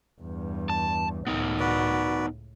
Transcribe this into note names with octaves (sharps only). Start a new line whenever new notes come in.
E2 G2
A5
C#2 A2 B3 D#4 A#4
F#4 B4 D5